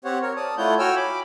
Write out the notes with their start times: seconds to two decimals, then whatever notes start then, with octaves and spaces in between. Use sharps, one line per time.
0.05 C4 G4 C5 C#5 F#5
0.22 A#4 C#5
0.37 D5 A5 D#6
0.58 A3 E4 F4 C#5 F#5 G6
0.79 F#4 C#5 G5 G#5 E6 F6
0.96 B5 D6